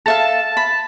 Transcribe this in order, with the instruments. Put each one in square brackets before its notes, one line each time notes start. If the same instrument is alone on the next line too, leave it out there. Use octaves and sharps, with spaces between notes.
[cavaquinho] A4 E5 F5 [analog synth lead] A5
[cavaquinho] B5